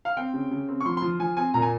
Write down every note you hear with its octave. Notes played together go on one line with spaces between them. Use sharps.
F5
C4 G5
C#3
C#3
C4
C#6
F3 C6
C6
F3
F3 G#5
C4 G#5
A#2 A#5
G#5